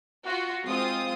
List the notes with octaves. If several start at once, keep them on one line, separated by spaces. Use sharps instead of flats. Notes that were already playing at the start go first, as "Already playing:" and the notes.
F4 F#4
G#3 C4 F4 D#6